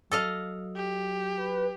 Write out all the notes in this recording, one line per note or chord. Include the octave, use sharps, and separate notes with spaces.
F#3 A4 D#5 F5
G4
B4